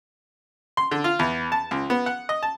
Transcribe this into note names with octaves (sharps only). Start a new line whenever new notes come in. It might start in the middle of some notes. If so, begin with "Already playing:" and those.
C6
D3
F4
E2
A5
C#2
B3
F#5
D#5
A5